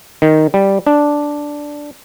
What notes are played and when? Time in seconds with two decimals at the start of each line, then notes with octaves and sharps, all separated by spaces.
0.22 D#3
0.54 G3
0.87 D4